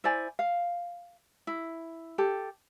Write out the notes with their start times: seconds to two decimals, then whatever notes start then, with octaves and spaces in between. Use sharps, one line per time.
0.04 E4 C5 D5 G#5
0.39 F5
1.47 E4
2.18 G4 A4